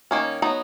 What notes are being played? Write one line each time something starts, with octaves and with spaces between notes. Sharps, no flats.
D#3 A#3 C#4
F#3 B3 D#4